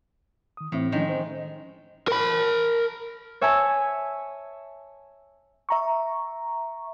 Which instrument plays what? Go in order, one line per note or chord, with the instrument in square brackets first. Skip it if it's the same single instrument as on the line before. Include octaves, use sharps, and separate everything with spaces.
[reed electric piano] D#3 D#6
[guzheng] A2 [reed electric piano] E3 C4 E5
[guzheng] D#3 G#3 G5 [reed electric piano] F3 C#4 D4
[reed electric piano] C5
[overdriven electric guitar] A#4 B5
[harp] C#5 E5 G#5 A5 E6 G#6
[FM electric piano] E5 A#5 C#6